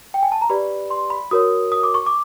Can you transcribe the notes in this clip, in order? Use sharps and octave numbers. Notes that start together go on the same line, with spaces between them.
G5
G#5
A5
A#5
G4 B4 D5 B5
C6
B5
F#4 A#4 C#5 D#6
D#6
D6
C#6
D6